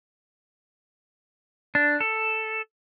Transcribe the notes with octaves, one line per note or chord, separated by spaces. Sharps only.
D4
A4